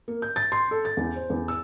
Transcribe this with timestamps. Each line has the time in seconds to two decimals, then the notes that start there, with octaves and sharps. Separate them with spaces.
0.08 A#3
0.22 G6
0.36 A6
0.52 C6
0.71 A4
0.85 A6
0.97 E2
1.16 C5
1.30 E2
1.48 E6